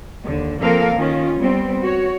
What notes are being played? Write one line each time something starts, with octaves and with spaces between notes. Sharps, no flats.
D#2 D3
F3 A#3 C4 A4 A#4 F5
D#3 C#4 F4
G3 B3 C4
F#4 C#5